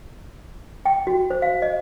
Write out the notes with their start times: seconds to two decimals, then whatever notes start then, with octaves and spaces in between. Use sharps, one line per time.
0.85 G5
1.07 F#4
1.30 C5
1.42 F5
1.62 D#5